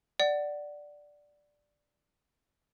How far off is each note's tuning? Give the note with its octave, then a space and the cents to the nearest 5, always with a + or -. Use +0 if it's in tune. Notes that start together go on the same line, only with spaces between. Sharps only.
D5 +0 F#5 +15